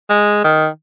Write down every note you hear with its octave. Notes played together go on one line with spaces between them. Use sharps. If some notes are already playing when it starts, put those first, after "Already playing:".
G#3
D#3